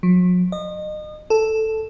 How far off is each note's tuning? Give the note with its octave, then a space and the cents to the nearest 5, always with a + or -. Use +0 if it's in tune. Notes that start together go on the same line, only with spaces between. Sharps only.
F#3 -45
D#5 -30
A4 +0